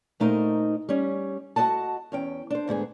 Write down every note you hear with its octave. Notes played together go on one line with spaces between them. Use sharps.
A#2 A3 D#4 A#4 C5 D#5
G3 C#4
F#4 G#4 D#5 F#5 A5
E2 C#4 G5
D4 C5
D2 G#2 B3 G#4